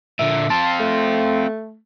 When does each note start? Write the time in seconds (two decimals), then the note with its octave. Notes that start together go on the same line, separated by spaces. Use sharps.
0.19 A#2 D3 E5
0.50 C4 F4 A5
0.80 A3